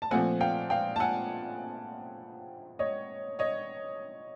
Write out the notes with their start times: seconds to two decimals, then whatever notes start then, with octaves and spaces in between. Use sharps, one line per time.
0.02 A5
0.11 A#2 F3 A3 C4 F#5 G#5
0.40 F5 G5
0.70 F5 G5
0.96 A5
1.00 F#5 G#5
2.79 C#5 D#5
3.39 C#5 D#5